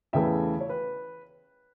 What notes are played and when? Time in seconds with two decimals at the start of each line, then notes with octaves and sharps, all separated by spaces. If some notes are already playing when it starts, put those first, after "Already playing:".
0.13 E2 C#3 E3 A3 E5 G5
0.61 C#5
0.69 B4